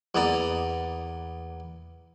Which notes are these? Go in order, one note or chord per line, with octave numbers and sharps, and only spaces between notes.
E2 A#3 B3 D5 A#5